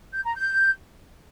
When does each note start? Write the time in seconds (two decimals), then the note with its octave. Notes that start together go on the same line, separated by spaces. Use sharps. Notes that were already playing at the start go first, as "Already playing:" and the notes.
0.12 G6
0.24 A#5
0.35 G6